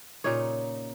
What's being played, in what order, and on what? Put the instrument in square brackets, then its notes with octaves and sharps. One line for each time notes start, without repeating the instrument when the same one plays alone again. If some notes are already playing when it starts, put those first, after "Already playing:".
[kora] A#2 C#3 D#4 C#5